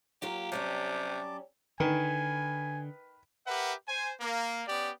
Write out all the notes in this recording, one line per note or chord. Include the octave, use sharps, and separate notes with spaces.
F#3 A#3 F4 G4
C3 F#3 G3 C#4 A5 D6
D3 D#3 B4 G#5
G4 A#4 B4 E5 F#5
C5 G#5
A#3
B3 C#4 G4 D5